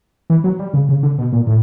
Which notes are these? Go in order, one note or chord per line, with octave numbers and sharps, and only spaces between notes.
E3
F#3
G3
C#3
C#3
D3
B2
A#2
A2